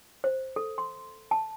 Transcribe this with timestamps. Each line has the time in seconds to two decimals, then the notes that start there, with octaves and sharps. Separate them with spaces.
0.24 C5
0.56 A4
0.78 C6
1.31 A5